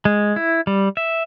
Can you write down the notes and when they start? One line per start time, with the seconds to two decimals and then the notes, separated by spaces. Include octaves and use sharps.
0.05 G#3
0.36 E4
0.67 G3
0.97 E5